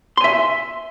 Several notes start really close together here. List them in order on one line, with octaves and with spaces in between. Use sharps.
C6 G#5 E5